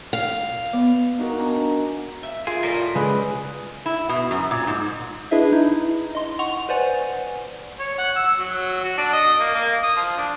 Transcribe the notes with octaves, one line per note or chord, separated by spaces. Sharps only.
F5
B3 D5
D#4 F#4 A#4
D4 G#5 A#5
E5
A#3 F4 G#4
A2 G3 A#4 D#5
C#3 G#3 G#4 B4
E4
B2
F#2
A#2
G#2
D4 E4 G#4 B4 D#5 E5
D#4 E4
D#5 C6
F#5 C6 C#6 F7
B4 C5 D5 F#5 G#5
C#5
F#5
E6
F#3
F#4
D4
D#5
A#3
A#3
D#6
F3
D4